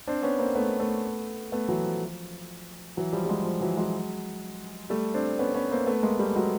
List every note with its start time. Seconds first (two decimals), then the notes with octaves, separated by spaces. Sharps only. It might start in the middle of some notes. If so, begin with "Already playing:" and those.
0.07 C4 D4
0.23 B3 C#4
0.39 A#3 C4
0.55 A3 B3
0.80 A3 B3
1.52 A3 B3
1.68 E3 F#3
1.84 F3
2.97 E3 F#3
3.13 F3 G3
3.25 G3
3.29 F#3 G#3
3.45 F3
3.61 E3 F#3
3.77 F#3 G#3
4.90 G3 A3
5.14 C4 D4
5.39 B3 C#4
5.54 B3 C#4
5.71 A#3 C4
5.87 A3 B3
6.03 G#3 A#3
6.19 G3 A3
6.36 F#3 G#3